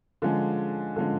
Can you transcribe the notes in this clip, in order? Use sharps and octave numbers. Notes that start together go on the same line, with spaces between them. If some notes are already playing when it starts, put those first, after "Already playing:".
D3 F3 G#3 C#4
D3 F3 G#3 C#4